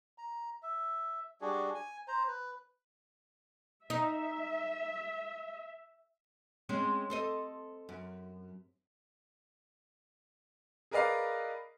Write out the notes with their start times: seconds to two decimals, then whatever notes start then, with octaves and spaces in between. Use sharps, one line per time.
0.18 A#5
0.63 E5
1.41 G3 D4 F#4 G#4
1.75 G#5
2.08 C5 A#5
2.28 B4
3.90 D#4 E5
6.69 G#3 C4 C#4
7.10 A4 C5 D#5
7.89 F#2
10.91 G#4 A#4 B4 D5 D#5 F5